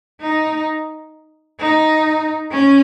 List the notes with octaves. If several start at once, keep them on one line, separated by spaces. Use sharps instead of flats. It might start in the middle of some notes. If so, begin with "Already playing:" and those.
D#4
D#4
C#4